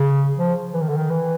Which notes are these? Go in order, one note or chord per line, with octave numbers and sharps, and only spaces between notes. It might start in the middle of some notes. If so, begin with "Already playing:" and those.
Already playing: C#3
F3
E3
D#3
D3
D#3
E3